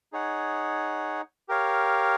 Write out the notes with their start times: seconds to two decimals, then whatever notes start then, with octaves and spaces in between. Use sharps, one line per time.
0.13 D#4 G#4 C#5 F#5
1.49 G4 A#4 C#5 F5